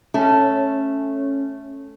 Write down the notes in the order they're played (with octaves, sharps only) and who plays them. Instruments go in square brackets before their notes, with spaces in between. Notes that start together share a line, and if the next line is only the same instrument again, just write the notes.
[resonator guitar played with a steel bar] A3 [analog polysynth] C#4